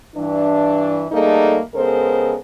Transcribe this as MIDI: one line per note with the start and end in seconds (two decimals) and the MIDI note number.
0.16 1.06 43
0.16 1.06 52
0.16 1.06 62
1.11 1.59 55
1.11 1.59 57
1.11 1.59 58
1.11 1.59 63
1.11 1.59 68
1.11 1.59 69
1.75 2.36 49
1.75 2.36 56
1.75 2.36 59
1.75 2.36 69
1.75 2.36 70
1.75 2.36 72